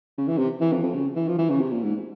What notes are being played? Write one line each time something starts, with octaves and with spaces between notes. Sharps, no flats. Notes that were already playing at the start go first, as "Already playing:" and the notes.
C#3
E3
C3
E3
F2
F2
C#3
E3
F3
E3
C#3
C3
A#2
G#2